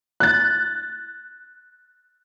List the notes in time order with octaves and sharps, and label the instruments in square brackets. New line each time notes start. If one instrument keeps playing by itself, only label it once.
[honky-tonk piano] F#6 A6